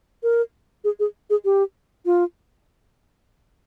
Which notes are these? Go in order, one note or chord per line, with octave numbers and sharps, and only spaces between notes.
A#4
G#4
G#4
G#4
G4
F4